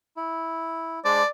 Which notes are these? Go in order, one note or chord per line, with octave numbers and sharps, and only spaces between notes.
E4
G#3 D4 C5 D5